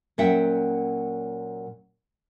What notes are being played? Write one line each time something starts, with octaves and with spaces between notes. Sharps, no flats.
A#2 F#3 C#4 E5 F#5 G5